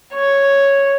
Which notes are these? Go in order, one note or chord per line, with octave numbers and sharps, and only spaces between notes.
C#5